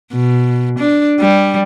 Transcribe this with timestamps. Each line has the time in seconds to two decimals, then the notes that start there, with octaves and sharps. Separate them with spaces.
0.13 B2
0.79 D4
1.20 G3